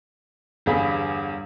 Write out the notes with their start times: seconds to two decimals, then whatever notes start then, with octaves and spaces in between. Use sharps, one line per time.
0.66 G1 E2 G#4 F5 B5 B6